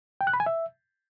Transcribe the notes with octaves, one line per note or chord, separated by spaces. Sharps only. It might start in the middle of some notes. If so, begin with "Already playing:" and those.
G5
F#6
B5
G#5
E5